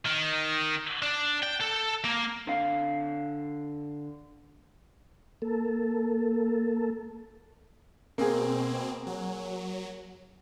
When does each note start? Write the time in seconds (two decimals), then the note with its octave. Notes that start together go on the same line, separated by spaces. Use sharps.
0.06 D#3
1.02 D4
1.43 G5
1.61 A4
2.05 A#3
2.47 D3 F5
5.42 A#3 A4
8.18 B2 A#3 C4 G#4
9.06 F#3